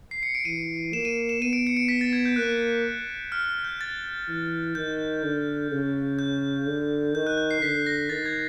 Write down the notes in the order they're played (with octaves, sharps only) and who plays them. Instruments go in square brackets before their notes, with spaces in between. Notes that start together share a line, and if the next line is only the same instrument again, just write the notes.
[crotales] C7
C#7
D7
[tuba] E3 [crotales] D#7
[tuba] A#3 [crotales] E7
[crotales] D#7
E7
[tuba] B3 [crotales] D#7
[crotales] D7
C#7
D7
B6
A6
G#6
G6
[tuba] A#3 [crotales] F#6
[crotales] F6
G6
A6
[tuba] E3
[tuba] D#3 [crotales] G6
[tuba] D3
C#3
[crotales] G6
[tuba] D3
[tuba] D#3 [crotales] G6
[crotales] F#6
G6
C7
[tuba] D3 [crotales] B6
[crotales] A#6
[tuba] D#3 [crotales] A6
[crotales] G#6